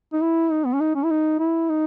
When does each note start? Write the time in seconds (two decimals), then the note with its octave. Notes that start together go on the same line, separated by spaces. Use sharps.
0.13 D#4
0.22 E4
0.51 D#4
0.66 B3
0.73 C#4
0.80 D#4
0.95 C#4
1.04 E4
1.10 D#4
1.39 E4
1.69 D#4